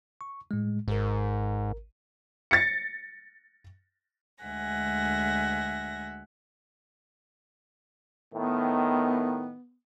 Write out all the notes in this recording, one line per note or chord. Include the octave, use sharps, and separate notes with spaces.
C#6
A2 G#3
G#1 G#2 A#4
A6 A#6 C#7
D2 G#3 E5 F#5 G#5 A#6
A2 D#3 B3